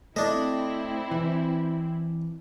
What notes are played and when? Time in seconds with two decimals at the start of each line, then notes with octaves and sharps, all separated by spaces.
0.16 A3 C4 D4 E4 D#5
1.11 E3